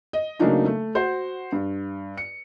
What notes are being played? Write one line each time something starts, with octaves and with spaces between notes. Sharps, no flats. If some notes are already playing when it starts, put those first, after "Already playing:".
D#5
C#3 F#3 A3 A#3 D4 D#4
A3
F#4 C5
G2
C#7